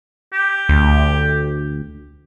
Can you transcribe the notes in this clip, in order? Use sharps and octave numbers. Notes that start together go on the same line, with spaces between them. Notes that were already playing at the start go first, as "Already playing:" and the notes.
G4
D2